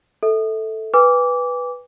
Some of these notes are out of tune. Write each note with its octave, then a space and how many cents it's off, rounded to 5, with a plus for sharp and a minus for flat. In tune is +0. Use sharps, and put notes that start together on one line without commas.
A4 +0 E5 -30
B4 +0 G#5 -40 D6 -20